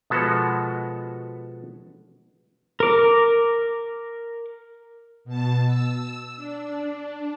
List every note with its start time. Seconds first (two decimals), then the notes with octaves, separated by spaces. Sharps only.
0.10 B2 F3 G#3 B3 F#4 A4
2.80 A#4 D6
5.25 B2 A5
5.67 E6
6.37 D4